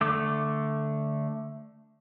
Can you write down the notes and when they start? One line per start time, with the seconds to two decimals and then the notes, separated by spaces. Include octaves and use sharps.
0.01 D3 A3 D6